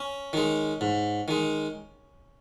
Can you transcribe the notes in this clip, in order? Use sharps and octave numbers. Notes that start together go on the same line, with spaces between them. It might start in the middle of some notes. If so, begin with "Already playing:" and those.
Already playing: C#4
D#3 G#3
G#2
D#3 G#3